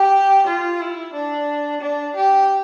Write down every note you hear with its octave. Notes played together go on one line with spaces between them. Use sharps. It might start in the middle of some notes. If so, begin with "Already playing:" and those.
Already playing: G4
F4
E4
D4
D4
G4